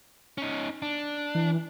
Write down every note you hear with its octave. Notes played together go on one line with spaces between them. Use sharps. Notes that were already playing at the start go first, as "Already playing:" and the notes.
C#4 D#4
D4
E3